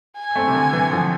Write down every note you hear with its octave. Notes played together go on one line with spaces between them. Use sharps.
G#5
A3 C4
C3
D3
C3 E3
D3 F3